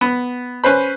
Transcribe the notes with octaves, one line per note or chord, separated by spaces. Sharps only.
B3
C#4 B4 C5 B5